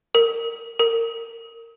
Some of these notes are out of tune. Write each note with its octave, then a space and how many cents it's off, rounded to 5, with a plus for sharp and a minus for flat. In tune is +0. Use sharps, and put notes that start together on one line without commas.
A#4 -20
A#4 -25